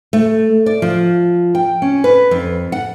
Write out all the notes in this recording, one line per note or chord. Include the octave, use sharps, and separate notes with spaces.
A3
D5
F3
G5
C#4
B4
F2
F#5